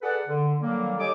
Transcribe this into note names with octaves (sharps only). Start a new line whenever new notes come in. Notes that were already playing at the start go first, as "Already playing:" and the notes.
G#4 A4 B4 D5 F#5
D3
D3 D#3 F#3 G3 A#3
D#4 G4 A4 C#5 G#5 D6